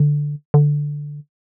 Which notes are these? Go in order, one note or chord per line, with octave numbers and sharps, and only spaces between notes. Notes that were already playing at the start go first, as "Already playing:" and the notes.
Already playing: D3
D3